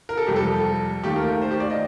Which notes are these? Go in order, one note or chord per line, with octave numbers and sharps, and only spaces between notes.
A#4
A4
F2 C3 G3 G4
A4
D#2 D#3 A3 G4
A#4
C5
G4
D5
D#5